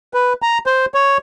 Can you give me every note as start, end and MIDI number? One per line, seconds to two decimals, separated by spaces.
0.14 0.33 71
0.42 0.58 82
0.66 0.86 72
0.94 1.18 73